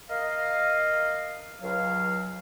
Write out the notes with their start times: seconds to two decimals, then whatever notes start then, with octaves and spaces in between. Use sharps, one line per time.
0.10 A#4 D#5 F5
1.62 C#2 F#3 F5